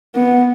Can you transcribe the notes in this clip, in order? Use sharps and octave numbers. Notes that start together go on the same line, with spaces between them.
B3